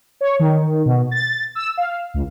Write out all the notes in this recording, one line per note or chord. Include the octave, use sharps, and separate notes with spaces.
C#5
D#3
B2
A6
E6
F5
C#2